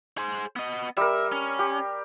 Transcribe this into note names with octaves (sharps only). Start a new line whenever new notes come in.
G#4 C5
B3 D#5
G3 A#4 E5
C#4
G4